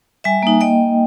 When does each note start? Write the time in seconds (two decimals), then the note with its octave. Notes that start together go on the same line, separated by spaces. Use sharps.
0.24 G3 E5 G#5
0.43 A#3 D#4
0.61 A#3 D#5 G5